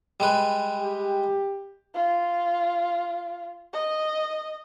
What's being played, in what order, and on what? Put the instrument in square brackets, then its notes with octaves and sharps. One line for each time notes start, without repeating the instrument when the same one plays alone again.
[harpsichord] G3 G#3 B4
[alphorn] G4
[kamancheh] F4
D#5